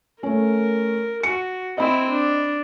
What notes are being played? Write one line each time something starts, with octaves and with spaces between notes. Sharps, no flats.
A3 C#4 A#4
F#4 C#7
C4 E4 D#5 B5
D4